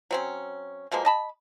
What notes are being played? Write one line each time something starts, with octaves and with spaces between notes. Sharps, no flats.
F#3 C4 C#4
B2 F3 G#3 A#3
D#5 A5 B5